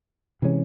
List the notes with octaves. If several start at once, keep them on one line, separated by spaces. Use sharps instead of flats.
C3 E3 G#3 C#4